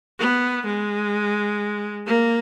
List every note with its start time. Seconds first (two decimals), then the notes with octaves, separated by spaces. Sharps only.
0.19 B3
0.66 G#3
2.07 A#3